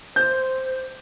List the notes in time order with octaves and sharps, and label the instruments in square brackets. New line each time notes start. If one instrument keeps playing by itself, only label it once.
[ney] C5 [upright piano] G6